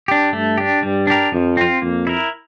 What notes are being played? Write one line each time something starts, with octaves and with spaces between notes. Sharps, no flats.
D4 G4
G2 A3
D4 G4
G2 G3
D4 G4 A#4
F2 F3
C4 F4
F2 A#3
E4 A#4